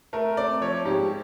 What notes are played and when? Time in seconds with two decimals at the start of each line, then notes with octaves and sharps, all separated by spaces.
0.13 A3 A#4
0.37 C4 D5
0.61 F3 C#5
0.85 G#2 G4